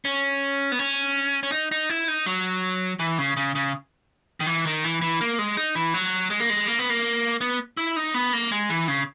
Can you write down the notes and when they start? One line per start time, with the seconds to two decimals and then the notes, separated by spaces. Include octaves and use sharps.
0.05 C#4
0.72 B3
0.79 C#4
1.43 C#4
1.52 D#4
1.72 D#4
1.90 E4
2.08 D#4
2.27 F#3
3.00 E3
3.18 C#3
3.37 C#3
3.55 C#3
4.40 D#3
4.46 E3
4.66 D#3
4.84 E3
5.02 E3
5.21 A#3
5.39 G#3
5.57 D#4
5.75 E3
5.94 F#3
6.30 G#3
6.40 A#3
6.50 G#3
6.67 A#3
6.79 B3
6.90 A#3
7.41 B3
7.77 E4
7.96 D#4
8.14 B3
8.33 A#3
8.52 G#3
8.70 E3
8.88 C#3